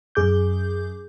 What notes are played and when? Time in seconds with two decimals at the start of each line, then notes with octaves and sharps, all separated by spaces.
0.15 F#2 G#4 D6 G6